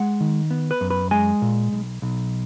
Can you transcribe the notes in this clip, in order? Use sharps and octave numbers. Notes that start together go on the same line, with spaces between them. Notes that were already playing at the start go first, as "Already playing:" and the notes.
Already playing: G#3 F#5
D#3
B3
B4
F#2
B4
G#3 G#5
A#2
B1
B1